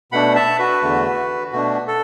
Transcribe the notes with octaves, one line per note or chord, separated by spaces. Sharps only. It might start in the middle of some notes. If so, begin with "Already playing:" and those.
B2 A3 D4 F#5 B5
E5 A5
F#4 B4
E2 D3 A3
B2 A3 D4 F#4
A4